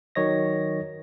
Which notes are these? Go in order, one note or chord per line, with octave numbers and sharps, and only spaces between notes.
D#3 F#3 C#5 D#5 A#6